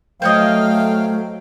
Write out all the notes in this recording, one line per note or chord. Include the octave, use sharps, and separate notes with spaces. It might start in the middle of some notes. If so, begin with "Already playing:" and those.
F#3 A3 C5 C#5 D#5 F5 G5